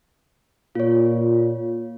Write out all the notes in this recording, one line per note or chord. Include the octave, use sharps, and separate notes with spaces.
A#2 F4 C#5